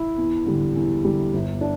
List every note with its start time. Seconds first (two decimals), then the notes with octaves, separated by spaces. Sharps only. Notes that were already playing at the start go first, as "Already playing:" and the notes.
Already playing: E4
0.17 E2
0.46 D3 G3
0.75 E2
1.04 D3 G3
1.33 G1
1.61 D4